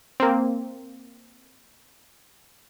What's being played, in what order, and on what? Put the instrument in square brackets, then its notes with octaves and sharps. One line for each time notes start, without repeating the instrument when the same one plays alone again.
[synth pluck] A#3 C4